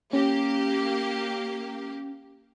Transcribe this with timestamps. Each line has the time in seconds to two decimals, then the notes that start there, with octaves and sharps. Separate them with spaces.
0.13 A#3 C#4 G4